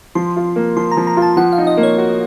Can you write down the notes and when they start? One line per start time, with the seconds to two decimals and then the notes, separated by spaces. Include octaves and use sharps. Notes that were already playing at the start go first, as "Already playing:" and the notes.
0.15 F3 C6
0.36 F4
0.56 A#3
0.76 F3 C6
0.92 A#5
0.97 F3
1.07 A#5
1.17 F4
1.22 A5
1.37 F3 F#5
1.53 F5
1.58 D#4
1.67 D#5
1.77 A#3
1.83 C#5
1.98 F#4